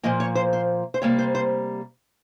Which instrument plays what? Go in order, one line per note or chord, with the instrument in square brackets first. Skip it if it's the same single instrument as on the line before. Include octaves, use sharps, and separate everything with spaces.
[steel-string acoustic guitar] A#2 F3 A#3 D#5
C#5
C5
C5
C5
C3 G3 A#3 C#5
C5
C5